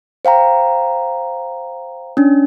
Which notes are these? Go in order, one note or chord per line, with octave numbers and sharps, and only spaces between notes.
C5 F5 G5 A#5
C#4 D4